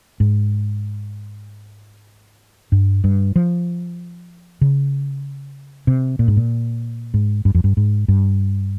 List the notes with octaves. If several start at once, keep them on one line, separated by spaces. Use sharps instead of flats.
G#2
G2
G2
F3
C#3
C3
A#2
G#2
A#2
G#2
G2
F2
G2
G#2
G2